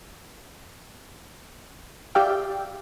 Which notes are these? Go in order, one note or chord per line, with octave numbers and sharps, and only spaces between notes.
G4 D5 E5 F5 G5